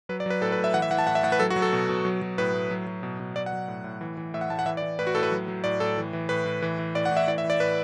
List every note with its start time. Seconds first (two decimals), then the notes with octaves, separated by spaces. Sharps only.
0.09 F#3 B4
0.20 D5
0.26 F#3 B4
0.41 A2 A4
0.52 B4
0.58 A2
0.64 E5
0.74 E3 F#5
0.82 E5
0.91 E3 F#5
0.99 A5
1.07 A2 F#5
1.15 E5
1.23 A2 F#5
1.32 B4
1.40 F#3 A4
1.50 F#4
1.56 F#3
1.62 A4
1.73 B2
1.89 B2
2.05 F#3
2.22 F#3
2.38 A2 B4
2.54 A2
2.71 F#3
2.87 F#3
3.03 B2
3.20 B2
3.35 F#3 D5
3.46 F#5
3.53 F#3
3.68 A2
3.84 A2
4.01 E3
4.17 E3
4.34 A2 E5
4.41 F#5
4.50 A2 A5
4.59 F#5
4.66 E3 E5
4.77 D5
4.82 E3
4.99 A2 B4
5.07 F#4
5.15 A2 A4
5.23 B4
5.32 F#3
5.48 F#3
5.64 A2 D5
5.80 A2 A4
5.98 E3
6.13 E3
6.29 A2 B4
6.45 A2
6.62 E3
6.79 E3
6.95 A2 D5
7.05 F#5
7.11 A2
7.17 E5
7.28 E3 D5
7.38 E5
7.44 E3
7.50 D5
7.60 A2 B4